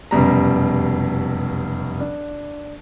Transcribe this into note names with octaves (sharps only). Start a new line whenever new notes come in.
F1 F#2 B2 G3 A#5
D4